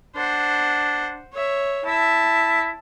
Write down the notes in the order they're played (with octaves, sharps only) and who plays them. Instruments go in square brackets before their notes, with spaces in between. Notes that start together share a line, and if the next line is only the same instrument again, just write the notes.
[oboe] D4 [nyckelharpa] C5 F#5
[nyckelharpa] C#5 E5
[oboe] E4 [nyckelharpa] E5 A5